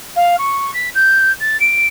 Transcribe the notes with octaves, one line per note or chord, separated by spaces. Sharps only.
F5
C#6
B6
G6
A6
D7